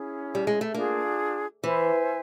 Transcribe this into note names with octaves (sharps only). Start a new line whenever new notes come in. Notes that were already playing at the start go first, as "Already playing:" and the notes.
Already playing: C#4 E4 G#4
G3
G#3
A3
A#3 D4 F4 G#4
E3 C5 E5 G#5